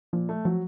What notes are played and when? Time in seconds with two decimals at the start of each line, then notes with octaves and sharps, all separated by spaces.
0.13 A#2 F3
0.29 A3
0.45 F3 F#3